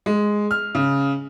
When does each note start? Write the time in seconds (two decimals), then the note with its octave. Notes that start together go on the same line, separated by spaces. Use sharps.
0.06 G#3
0.51 F6
0.75 C#3